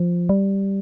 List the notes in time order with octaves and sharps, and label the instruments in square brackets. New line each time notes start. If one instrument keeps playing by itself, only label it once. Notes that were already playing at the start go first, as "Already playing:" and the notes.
Already playing: [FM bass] F3
G3